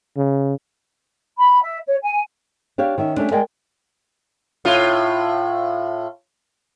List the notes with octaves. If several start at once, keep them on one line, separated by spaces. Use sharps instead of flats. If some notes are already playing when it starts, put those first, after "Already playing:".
C#3
B5
E5
C#5
G#5
D4 G4 C#5 F5
D#3 C#4 E5
G3 A3 C#4 D4
G#3 A#4 D5 D#5 G5 G#5
A2 F4